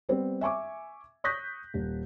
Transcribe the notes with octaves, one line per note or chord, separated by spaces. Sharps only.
G3 B3 C4
E5 G#5 C#6 D6
C#6 D#6 F#6 G6 A#6 B6
D#1